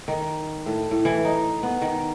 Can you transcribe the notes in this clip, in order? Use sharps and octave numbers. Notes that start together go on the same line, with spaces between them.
D#3
A2
A2
E3
D#4
B3
D#3